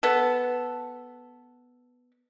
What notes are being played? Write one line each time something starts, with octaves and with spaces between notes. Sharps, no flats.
B3 A4